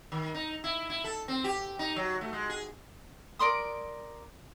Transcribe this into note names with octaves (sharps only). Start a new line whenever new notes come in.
D#3
D#4
E4
E4
A4
C4
G4
D#4
F#3
A3
G#3
G#4
A#4 D5 C6 D#6